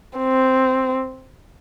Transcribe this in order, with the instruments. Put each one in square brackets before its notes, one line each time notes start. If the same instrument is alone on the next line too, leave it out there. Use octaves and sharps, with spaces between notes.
[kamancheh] C4